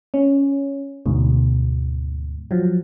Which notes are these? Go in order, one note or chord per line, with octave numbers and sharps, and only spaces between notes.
C#4
D2 G#2 B2
F3 F#3